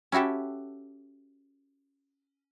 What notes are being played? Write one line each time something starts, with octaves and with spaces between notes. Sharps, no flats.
C#4 E4 F#4 G4 A4